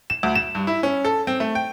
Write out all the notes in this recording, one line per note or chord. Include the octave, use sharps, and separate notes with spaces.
E7
D2
E7
G2
E4
C#4
A4
C4
A3
G5